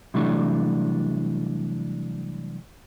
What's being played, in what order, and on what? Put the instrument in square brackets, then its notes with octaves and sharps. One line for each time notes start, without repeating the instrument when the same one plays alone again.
[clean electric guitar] C3 E3 F#3 G3 A3 D4